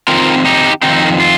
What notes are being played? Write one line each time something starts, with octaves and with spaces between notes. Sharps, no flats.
F2 C3 D#3 C4 F4 A#4
D#4 G4
F2 C3 D#3 C4 D#4
F4